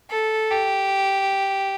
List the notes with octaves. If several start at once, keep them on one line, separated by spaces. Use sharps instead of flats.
A4
G4